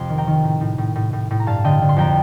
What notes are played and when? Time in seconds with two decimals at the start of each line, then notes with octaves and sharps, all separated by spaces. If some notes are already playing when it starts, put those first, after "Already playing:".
Already playing: F2 C3 F5 C6
0.09 D#3
0.18 G5 A#5
0.27 D#3
0.44 A2
0.61 A2
0.78 A2
0.95 A2
1.13 A2
1.31 A2
1.40 A#5
1.46 G2 F5 A5
1.64 D3 D#5 G5
1.82 D3
1.89 C6
1.96 F2 G5 A#5